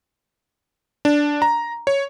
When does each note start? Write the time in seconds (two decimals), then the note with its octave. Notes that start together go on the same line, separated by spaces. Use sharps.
1.05 D4
1.42 A#5
1.87 C#5